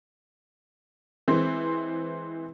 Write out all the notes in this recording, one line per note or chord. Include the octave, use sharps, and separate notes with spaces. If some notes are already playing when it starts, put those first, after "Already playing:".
E3 G#3 C4